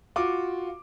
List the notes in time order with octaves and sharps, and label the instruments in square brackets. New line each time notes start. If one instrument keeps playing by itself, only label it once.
[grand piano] F4 F#4 D6